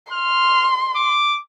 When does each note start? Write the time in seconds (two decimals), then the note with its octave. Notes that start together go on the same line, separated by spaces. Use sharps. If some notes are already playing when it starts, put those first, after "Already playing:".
0.13 C6 F6
0.96 D6